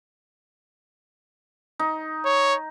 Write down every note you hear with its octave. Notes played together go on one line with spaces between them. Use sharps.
D#4
C#5